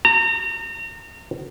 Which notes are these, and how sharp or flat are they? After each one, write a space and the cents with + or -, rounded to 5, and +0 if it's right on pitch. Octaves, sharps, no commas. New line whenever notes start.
A#5 -35